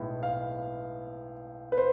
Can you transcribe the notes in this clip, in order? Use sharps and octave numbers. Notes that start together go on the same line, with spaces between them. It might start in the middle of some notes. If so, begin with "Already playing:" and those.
Already playing: B1 A2 G#3 B3
F5
B4
C5